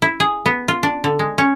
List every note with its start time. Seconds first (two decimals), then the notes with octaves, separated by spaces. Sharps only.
0.02 E4
0.20 G#4
0.46 B3
0.68 F4
0.83 D4
1.04 D3
1.19 G#3
1.38 C#4